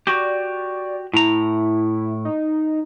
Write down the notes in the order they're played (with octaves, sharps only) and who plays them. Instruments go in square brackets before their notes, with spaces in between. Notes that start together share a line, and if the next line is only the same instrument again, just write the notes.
[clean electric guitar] F#4 G4 [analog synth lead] D5
[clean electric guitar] A2 A#5 [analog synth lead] E4
[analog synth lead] D#4